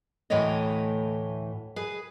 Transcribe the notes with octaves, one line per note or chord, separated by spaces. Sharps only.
D2 A2 E3 A3 C#5 D#5
G#4 B4